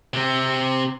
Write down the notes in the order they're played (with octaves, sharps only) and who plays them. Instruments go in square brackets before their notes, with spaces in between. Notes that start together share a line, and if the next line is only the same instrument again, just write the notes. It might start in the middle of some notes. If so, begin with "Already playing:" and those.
[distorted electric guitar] C3 C4